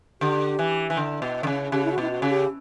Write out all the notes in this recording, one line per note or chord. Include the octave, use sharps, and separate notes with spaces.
D3 G4
E3
E3
D3
B2
D3
C#3
C#3 G4
E4
F#4
B2 E4
F#4
C#3
G4